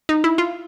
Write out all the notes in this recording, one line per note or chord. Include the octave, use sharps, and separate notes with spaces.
D#4
E4
F4